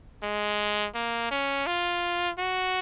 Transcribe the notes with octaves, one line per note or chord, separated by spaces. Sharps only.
G#3
A#3
C#4
F4
F#4